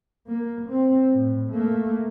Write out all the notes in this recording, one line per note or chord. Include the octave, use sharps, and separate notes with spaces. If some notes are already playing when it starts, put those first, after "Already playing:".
A#3
C4
A2
A3 A#3